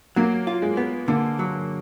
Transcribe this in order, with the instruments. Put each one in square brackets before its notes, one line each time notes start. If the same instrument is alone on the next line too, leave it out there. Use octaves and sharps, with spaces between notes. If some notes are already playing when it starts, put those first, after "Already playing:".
[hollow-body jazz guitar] F#3 [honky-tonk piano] A#3
[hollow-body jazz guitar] F4
[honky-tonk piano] G#3
[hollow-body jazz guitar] B3
[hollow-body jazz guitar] D3 [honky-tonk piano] A#3
[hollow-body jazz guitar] F#3